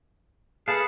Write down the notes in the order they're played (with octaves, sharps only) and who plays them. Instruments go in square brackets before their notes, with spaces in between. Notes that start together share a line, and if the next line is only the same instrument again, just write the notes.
[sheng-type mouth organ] G#4 A5 [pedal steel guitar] A4 B4 F5